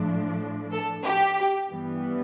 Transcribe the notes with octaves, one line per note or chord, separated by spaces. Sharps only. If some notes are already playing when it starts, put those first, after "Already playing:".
Already playing: A2 F3 A3 D4
A4
G4
G2 E3 G3 B3